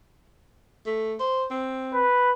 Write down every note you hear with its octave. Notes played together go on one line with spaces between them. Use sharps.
A3
C5
C4
B4